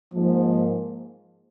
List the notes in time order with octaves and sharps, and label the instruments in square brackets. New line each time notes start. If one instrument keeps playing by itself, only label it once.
[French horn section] G#2 F3 A#3